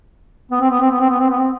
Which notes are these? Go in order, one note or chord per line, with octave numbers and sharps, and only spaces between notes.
B3
C4
B3
C4
B3
C4
B3
C4
B3
C4